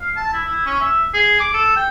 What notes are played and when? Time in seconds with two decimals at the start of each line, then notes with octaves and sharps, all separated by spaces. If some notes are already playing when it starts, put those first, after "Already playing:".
0.01 F5
0.16 A5
0.33 E4
0.48 E4
0.66 C#4
0.80 E5
1.14 G#4
1.40 D6
1.54 A4
1.76 G5